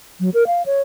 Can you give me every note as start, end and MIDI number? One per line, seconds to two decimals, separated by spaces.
0.20 0.30 54
0.34 0.47 70
0.47 0.62 77
0.66 0.81 73